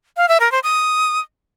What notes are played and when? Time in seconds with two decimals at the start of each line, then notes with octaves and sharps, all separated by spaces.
0.17 F5
0.29 E5
0.40 A#4
0.52 C5
0.63 D#6